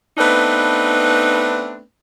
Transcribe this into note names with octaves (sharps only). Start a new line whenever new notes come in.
A3 B3 C4 D4 D#4 B4